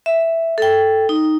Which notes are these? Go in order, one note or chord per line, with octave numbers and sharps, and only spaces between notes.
E5
A4 G5
D#4